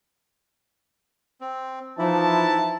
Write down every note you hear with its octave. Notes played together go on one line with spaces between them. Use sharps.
C4
E3 F3 D#4 E4 A5